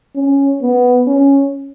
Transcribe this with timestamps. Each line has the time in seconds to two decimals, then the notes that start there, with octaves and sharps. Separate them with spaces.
0.16 C#4
0.62 B3
1.07 C#4